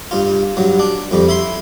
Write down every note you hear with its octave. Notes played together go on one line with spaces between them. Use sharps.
G2 F4
G2 F#3
D4
F2 G3
E4 B5 C6